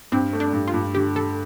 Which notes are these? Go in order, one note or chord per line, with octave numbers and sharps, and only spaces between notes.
G2 C4
A3
D4
G2
F4
G2
D3 G4
D3 A4